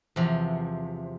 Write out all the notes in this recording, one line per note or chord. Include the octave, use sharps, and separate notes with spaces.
E2 C3 F3